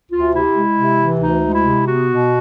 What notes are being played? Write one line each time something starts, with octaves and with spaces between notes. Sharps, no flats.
D2 F4
C3 E4
G#3
C3
E3
D2 D#4
G#3
E4
C3
B3 F#4
B2